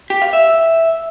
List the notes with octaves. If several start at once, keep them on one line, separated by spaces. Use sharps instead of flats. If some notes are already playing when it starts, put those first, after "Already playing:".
G4
F5
E5